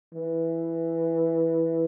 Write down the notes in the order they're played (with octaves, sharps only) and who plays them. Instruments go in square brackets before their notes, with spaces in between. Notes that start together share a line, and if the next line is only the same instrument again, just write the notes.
[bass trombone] E3